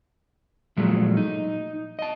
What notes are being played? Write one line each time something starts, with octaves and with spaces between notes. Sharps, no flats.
A#2 F3 F#3 G#3 A3
D#4
D#5 A5